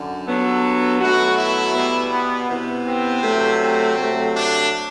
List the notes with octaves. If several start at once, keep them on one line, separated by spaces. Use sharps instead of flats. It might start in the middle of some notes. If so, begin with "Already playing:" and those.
Already playing: F#2 D3
G2 F#3 B3 A4
B2 F#3 A3 F#4
E4
B2 G3 B3
B3
C3 E3 B3
C4
C3 F#3 A3
C4
C3 F#3 A3
D4